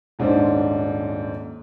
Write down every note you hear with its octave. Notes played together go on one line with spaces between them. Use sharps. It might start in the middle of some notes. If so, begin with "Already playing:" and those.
D#1 G#2 C#4 D4 C5